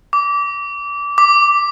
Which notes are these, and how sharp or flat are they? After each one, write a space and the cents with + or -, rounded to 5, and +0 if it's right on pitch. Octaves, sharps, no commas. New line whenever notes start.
D6 -25
D6 +0